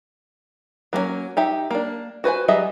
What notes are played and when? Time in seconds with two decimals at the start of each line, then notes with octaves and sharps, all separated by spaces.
0.93 F#3 A#3 B3 C#4
1.37 D#4 G4 E5
1.71 A#3 D4
2.24 F#4 B4 C5 G#5
2.48 F#3 G3 G#4 D#5 E5